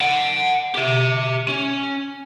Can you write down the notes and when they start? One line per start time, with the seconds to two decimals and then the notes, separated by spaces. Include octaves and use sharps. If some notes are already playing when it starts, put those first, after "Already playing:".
0.01 F#5 A5
0.75 G4 E5
1.48 C#4